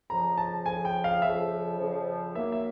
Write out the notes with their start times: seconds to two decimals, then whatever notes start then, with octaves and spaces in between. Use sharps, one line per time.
0.10 F2 C#3 F3 A#5
0.38 A5
0.65 F2 C#3 F3 G#5
0.85 G5
1.04 F5
1.22 F2 C#3 F3 E5
1.78 F2 C#3 F3
2.35 D#3 F#3 A#3 E5
2.52 E5